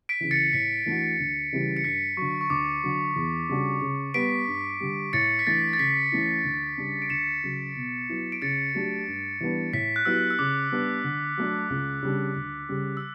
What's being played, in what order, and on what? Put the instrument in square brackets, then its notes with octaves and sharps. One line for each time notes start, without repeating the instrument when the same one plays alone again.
[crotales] B6 D7
[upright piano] C#3 E3
[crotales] A6 C#7
[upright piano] A2 [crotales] B6
[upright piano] E3 A3 D4 F#4
D2
C#3 E3 G3 C#4
[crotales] C#7
[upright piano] G2 [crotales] B6
[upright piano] D3 F#3 [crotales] C#6
[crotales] C#6
[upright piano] D2 [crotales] D6
[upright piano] D3 F#3
E2
C#3 G3 D4 F#4
C#3
[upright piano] G3 B3 [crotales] B6 D7
[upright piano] G2
D3 G3
[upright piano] A2 [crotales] A6 C#7
[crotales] B6
[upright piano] E3 A3 D4 [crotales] A6
[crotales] A6
[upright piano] C#3 [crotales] B6
[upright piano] E3 A3 C#4 E4
D2
C#3 G3 D4
[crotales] D7
[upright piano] D2 [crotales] C#7 E7
[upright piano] C#3 F#3
B2
F#3 B3 E4
[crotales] D7
[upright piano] C#3 [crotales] A6 C#7
[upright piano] F#3 A3 D4 G4
G2
E3 G3 B3 D4
[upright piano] A2 [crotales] B6
[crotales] F#6
[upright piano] F#3 B3 E4 G4 [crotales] E6
[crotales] E6
[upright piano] C#3 [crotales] D6
[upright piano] G3 B3 D4
D3
F#3 A3 D4
C#2
C#3 G3 D4
D2
C#3 G3
[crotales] E6